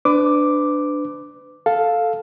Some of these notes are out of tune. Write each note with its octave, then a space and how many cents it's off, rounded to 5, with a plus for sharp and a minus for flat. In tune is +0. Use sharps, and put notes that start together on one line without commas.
D4 +5 B4 +30 D6 +0
A4 +0 F5 +5